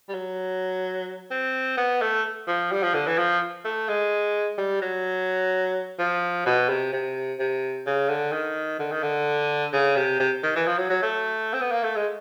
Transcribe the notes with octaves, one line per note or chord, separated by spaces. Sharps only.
G3
F#3
C4
B3
A3
F3
G3
F3
D3
E3
F3
A3
G#3
G3
F#3
F3
B2
C3
C3
C3
C#3
D3
D#3
D3
D#3
D3
C#3
C3
C3
D#3
E3
F3
F#3
F#3
A3
C4
B3
A#3
A3
G#3